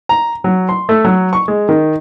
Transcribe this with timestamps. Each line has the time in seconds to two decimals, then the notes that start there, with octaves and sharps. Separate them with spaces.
0.09 A#5
0.44 F#3
0.69 C6
0.89 A3
1.05 F#3
1.33 C#6
1.48 G#3
1.69 D#3